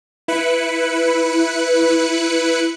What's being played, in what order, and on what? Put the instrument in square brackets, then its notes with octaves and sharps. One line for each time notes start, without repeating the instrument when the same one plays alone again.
[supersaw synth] E4 B4 F#6 C#7